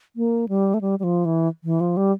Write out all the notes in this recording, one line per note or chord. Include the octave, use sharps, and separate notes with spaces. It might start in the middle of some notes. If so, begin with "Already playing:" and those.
A#3
G3
A3
G3
G3
F3
E3
E3
F3
G3